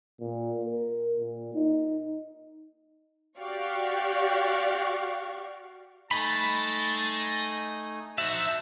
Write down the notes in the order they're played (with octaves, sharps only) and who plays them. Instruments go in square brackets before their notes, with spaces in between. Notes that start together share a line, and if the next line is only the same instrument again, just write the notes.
[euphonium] A#2
A#4
A#2
D#4
[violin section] F#4 G4 D5 F5 C#6
[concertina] A3 D#4 G#5 [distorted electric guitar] D#5 C6 [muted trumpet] A5 [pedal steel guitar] B5
[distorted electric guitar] F3 D5 [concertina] D#4 C5 [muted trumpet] F#4 [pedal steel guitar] E5